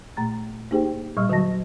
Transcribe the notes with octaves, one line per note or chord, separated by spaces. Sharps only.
A#2 A3 A#5 A6
A#3 D#4 G4 G#4 C5 G5
A#2 G3 D#5 C#6 E6 F6
D3 F#3 F#4 D#5 A5 A#6